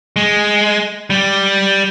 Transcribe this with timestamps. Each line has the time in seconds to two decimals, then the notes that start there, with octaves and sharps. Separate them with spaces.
0.16 G#3
1.10 G3